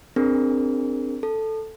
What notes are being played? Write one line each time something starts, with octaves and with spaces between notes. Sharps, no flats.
C4 D4 G#4 A#4
A4